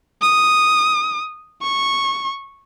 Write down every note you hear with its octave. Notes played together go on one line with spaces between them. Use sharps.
D#6
C#6